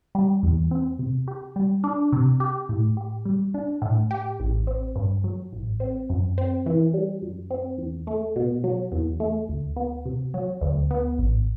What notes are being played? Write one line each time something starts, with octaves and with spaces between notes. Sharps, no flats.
G3
E2
C4
C3
G4
G3
D4
C3
G4
A2
G4
G3
D4
A2
G4
A1
C4
G2
F#3
A1
C4
F#2
C4
E3
G3
F#2
C4
E2
A3
B2
F#3
E2
A3
D2
B3
C3
F#3
D2
B3
A1